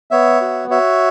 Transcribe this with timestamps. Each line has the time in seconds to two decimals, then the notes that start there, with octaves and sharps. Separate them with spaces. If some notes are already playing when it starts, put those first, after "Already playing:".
0.11 B3 C#5 E5
0.41 F#4
0.70 F#4 C#5 E5